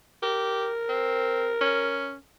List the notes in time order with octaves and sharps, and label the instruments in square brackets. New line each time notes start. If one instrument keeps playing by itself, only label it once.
[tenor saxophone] G4 [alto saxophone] A#4
[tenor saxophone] C4
C#4